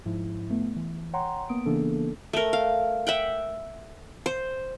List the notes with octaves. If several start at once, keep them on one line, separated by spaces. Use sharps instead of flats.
G#2 F3 E4
A3 B3
E3
C#5 F#5 G5 A#5 C6
A#3 B3 D#6 D7
C#3 E3 A#3 B3 D4 A4
A3 A#4
F5
E5 F#5 G5
C5